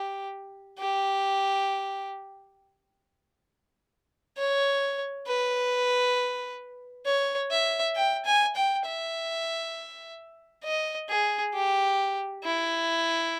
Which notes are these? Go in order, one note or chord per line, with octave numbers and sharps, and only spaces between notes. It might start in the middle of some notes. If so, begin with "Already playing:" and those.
Already playing: G4
G4
C#5
B4
C#5
E5
G5
G#5
G5
E5
D#5
G#4
G4
E4